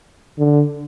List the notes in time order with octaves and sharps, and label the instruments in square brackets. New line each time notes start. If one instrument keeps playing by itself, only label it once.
[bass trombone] D3